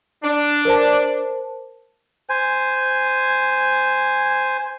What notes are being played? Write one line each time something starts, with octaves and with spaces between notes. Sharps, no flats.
D4
A#4 C5 A5
C5 G#5